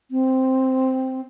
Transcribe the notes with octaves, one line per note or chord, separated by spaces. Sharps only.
C4